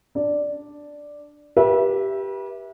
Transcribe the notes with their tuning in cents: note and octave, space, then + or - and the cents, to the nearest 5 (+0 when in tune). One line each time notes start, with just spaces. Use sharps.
D4 +0 D5 +0
G4 +0 B4 -35 E5 +0